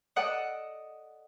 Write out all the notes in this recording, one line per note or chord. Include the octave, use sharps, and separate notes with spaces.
A4 D5 D#5 F#5 D#6